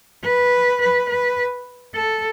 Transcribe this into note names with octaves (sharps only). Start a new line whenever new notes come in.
B4
B4
B4
A4